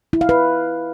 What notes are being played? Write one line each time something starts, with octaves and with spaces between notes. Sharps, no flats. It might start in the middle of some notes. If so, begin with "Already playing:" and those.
E4
F5
B4